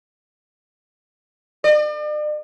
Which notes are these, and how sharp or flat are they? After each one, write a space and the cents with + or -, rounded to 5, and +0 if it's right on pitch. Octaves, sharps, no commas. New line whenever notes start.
D5 +45